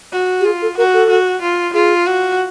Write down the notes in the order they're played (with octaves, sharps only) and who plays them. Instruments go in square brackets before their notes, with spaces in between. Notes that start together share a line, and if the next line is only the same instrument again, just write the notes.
[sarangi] F#4
[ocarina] G4
[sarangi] F4 [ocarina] G#4
[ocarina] A4
[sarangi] F#4 [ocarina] A#4
[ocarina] A4
[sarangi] F#4
F4
[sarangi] F4 [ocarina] G#4
[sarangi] F#4